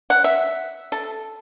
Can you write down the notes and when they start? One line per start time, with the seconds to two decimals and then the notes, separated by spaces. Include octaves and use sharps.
0.10 F#5
0.24 E5
0.92 A4